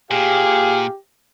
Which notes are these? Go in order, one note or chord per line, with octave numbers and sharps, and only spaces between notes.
A#2 G4 G#4 F5